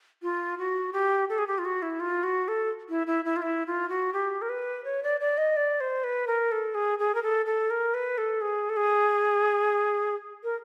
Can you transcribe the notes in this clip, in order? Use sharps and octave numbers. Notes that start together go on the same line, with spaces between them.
F4
F#4
G4
A4
G#4
G4
F4
F#4
E4
F4
F#4
A4
E4
E4
E4
F4
E4
F4
F#4
G4
A#4
B4
C#5
D5
D5
D#5
D5
C5
B4
A#4
A4
G#4
G#4
A#4
A4
A4
A#4
B4
A4
G#4
A4
G#4
A#4